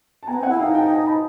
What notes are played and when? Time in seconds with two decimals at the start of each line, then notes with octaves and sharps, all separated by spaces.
0.23 A5
0.27 B3 G#5 A#5
0.38 C4
0.43 F#5 G#5
0.49 E4
0.59 D#4 F5 G5
0.74 G5 A5
0.90 G#5 A#5
1.06 A5 B5